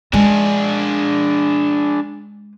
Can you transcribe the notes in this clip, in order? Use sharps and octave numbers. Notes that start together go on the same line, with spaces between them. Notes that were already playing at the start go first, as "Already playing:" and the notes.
G#3 D4 G#4